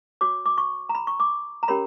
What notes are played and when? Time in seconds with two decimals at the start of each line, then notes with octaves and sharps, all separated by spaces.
0.21 F#4 C#5 D6
0.46 D6
0.58 C#6
0.89 A#5
0.95 B5
1.07 C#6
1.20 D6
1.63 A#5
1.68 C#4 G4 A#4 C#5 B5